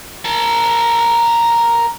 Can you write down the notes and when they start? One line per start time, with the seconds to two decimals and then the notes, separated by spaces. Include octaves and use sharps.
0.25 A#4 A5